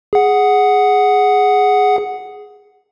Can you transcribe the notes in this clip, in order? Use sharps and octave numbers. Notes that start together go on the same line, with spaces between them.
G#4 F#5